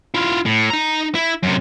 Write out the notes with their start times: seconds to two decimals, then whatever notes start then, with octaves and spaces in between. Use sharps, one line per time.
0.14 E4 F4
0.46 A2
0.70 D#4 A#5
1.15 E4
1.43 F#2 C3